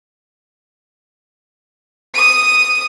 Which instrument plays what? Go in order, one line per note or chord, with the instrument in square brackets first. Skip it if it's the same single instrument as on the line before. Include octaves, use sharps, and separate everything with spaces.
[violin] D#6 D#7